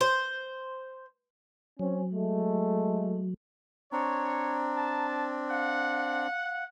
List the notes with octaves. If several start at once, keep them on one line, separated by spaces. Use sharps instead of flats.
C5
F#3 C4 C#4
G#3 A3
C4 D4 C#5 A#5
A5
F5 F#5